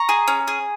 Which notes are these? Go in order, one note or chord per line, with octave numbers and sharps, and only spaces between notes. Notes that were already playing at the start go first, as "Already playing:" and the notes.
Already playing: A#5 C#6
G#4
C#4
G#4